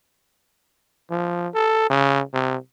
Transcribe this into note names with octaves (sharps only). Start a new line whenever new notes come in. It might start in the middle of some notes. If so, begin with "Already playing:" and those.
F3
A4
C#3
C3